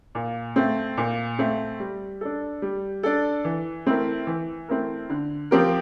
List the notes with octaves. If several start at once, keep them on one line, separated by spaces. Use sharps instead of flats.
A#2
A3 C4
A#2
A3 C4
G3
D4 A4
G3
D4 A4
E3
A3 C4 E4 A#4
E3
A3 C4 E4 A#4
D3
F3 C4 G4 A#4